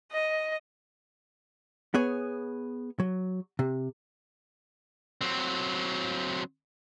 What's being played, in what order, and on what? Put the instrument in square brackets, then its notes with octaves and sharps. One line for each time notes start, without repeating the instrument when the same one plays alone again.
[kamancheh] D#5
[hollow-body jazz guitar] B3 G#4 C#5
F#3
C3
[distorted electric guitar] F#3 C4